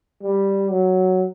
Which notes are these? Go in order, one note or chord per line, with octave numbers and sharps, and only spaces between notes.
G3
F#3